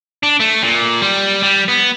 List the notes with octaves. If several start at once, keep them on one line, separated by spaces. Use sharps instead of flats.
D4
A3
A#2
G3
G3
B3